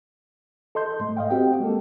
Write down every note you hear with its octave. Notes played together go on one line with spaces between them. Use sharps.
A4 D#5 C6 G6
G#2 A3
D#5 F5 G5
C4 F#4 G4 G5
G#3 A#3 A4